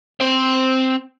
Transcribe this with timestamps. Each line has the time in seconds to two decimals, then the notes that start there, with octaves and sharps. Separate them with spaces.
0.21 C4 C5